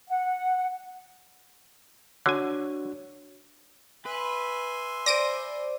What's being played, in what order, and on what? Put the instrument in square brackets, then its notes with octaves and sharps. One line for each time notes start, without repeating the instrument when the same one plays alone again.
[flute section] F#5
[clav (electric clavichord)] D3 G#5 [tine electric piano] D4 F#4 C#5
[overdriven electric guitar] B4 [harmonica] E5 G#5 C6
[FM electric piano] C5 D5 [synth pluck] A#6 D7 D#7